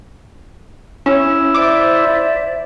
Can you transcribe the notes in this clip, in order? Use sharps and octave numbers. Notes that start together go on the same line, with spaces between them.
C#4 E4
C5 D5 E5 D6